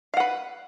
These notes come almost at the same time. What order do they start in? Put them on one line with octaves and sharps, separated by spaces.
F5 F#5 B4